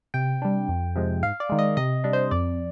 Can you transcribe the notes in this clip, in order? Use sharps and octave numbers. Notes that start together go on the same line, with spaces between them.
C3 G5
G3 D4
F2
C3 F3 G#3
G#2 F5
D5
D#3 G#3
D#5
C3 D#5
G3 D4
C5
F2 D5